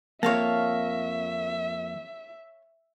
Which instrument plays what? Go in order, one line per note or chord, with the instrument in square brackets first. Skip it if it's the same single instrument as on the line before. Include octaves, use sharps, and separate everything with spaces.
[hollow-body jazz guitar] F2 A#3 [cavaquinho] C#5 F5 A5 [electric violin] E5